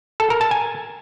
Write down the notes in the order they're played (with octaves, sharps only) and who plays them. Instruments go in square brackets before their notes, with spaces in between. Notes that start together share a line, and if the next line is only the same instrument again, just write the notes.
[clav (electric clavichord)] A4
A#4
A5
G#5